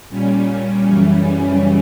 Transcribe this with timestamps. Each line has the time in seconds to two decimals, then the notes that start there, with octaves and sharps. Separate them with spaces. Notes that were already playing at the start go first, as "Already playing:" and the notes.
0.09 A#2 G3 C#4
0.85 F#2 C#3 E3 G3 C#4